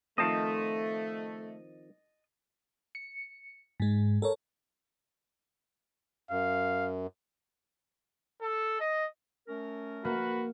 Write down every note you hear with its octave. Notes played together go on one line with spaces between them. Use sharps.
D#3 F3 A3 C4 D#5 A5
C#7
G#2 G#3
A4 A#4 C#5
F#2 F5
A4
D#5
A3 C#4 A#4
A#3 F#4 B4